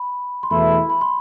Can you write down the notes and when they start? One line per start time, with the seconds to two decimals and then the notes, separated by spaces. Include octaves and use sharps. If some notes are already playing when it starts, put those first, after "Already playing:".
Already playing: B5
0.43 C6
0.51 E2 B2 A3 E4 B5
0.90 B5
1.01 C6